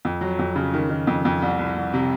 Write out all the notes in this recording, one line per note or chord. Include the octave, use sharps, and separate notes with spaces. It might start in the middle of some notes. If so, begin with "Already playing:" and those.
F2
F#3
F2
C#3
D#3
D#3
F2
F2
C2
C2
C2
C3